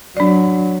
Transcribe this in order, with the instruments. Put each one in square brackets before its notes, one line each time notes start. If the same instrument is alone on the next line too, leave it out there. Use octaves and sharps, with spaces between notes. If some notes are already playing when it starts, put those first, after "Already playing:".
[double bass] F#3 [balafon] D4 D5